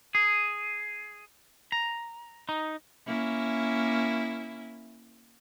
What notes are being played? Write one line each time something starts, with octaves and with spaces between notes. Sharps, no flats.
G#4
A#5
D#4
A#3 C#4 E4